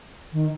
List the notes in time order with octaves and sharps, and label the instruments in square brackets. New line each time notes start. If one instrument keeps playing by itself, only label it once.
[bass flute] D#3